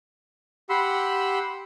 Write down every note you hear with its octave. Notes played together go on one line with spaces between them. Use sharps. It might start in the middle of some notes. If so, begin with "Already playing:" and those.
G4 F#5 B5 C6 E6